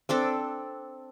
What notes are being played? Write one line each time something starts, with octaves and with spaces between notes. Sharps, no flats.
C4 D4 A4